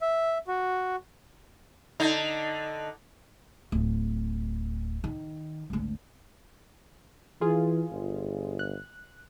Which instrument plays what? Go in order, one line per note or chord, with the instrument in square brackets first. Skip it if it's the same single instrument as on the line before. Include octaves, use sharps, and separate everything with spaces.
[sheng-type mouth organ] E5
F#4
[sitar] D3 D#4
[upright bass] D1
D#3
G#1 D2
[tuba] E3 [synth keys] F4 G#4
[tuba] G1
[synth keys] F#6